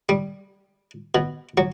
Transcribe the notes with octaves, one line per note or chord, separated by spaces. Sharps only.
G3
B2
F#3